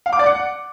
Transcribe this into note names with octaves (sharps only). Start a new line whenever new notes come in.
F5
D6
D5
F#5